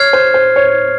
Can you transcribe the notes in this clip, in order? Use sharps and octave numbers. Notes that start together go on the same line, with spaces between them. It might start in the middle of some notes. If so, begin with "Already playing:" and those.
Already playing: C#5 F6 G#6 C7
C5
C5
C#5